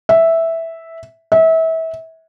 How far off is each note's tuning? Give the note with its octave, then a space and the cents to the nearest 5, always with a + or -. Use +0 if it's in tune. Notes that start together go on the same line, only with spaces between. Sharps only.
E5 -5
E5 -30